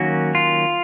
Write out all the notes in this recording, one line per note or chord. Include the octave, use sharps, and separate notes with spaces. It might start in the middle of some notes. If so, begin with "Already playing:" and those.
Already playing: D#3 F#3 A#3 C#4 F#4
F4